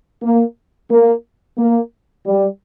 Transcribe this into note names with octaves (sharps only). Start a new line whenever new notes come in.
A#3
A#3
A#3
G3